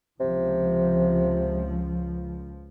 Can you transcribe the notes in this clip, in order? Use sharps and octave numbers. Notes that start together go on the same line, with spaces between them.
C#2 C3 F3